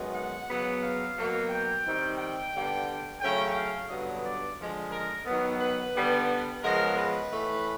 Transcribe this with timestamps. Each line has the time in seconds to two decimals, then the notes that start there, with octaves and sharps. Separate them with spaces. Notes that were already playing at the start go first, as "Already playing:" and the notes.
Already playing: F#2 D#3 G#3 B3
0.14 F#5
0.48 C#3 F#3 B3
0.81 F5
1.16 B2 F#3 A#3
1.50 G5
1.84 D#3 G3 C4
2.18 G5
2.53 D3 G3 B3
3.20 C#3 F#3 A3 C#4 G5
3.55 F5
3.89 G2 D3 F#3 B3 D#5
4.24 D5
4.58 D3 F3 G#3
4.91 A#4
5.26 D#3 F#3 B3
5.60 B4
5.94 D3 G3 B3
6.63 C#3 F3 G#3 B3 A#4
6.97 B4
7.31 A2 E3 A3